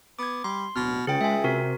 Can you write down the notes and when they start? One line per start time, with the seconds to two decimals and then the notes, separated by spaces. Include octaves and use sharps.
0.19 B3 D6 G#6
0.44 G3 C6
0.76 D1 B2 F6
1.07 C#2 C#3 G#4 G5
1.21 G#3 E5 G#5
1.44 C3 F#4 A#4